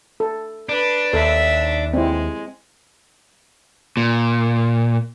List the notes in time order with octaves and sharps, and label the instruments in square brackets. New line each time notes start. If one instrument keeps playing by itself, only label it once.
[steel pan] A4
[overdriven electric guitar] D4 [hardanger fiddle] B4
[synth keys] D#2 [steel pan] A4 [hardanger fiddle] E5
[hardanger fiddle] G#3 [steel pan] C4 E4
[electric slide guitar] A#2